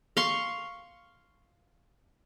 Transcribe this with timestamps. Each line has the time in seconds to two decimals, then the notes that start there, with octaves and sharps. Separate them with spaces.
0.17 F5 C6 C#6